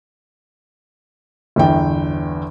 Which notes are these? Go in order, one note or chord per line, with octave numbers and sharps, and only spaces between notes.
G1 E2 G5